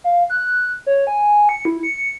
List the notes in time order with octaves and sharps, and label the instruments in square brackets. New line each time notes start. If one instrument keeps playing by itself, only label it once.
[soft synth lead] F5
F#6
C#5
G#5
C#7
E4
C#7